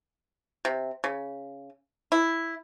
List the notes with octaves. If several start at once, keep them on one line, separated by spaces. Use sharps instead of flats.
C3
C#3
E4